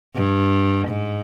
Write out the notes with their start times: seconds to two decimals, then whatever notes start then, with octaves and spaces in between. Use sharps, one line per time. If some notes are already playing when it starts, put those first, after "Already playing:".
0.15 G2
0.88 G#2